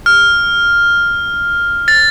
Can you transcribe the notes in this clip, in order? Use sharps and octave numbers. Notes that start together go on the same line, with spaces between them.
F6
A6